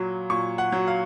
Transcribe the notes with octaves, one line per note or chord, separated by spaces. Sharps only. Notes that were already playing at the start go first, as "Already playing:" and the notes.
Already playing: A#2 F#3
A#2 C#6
F#5
F#3
F5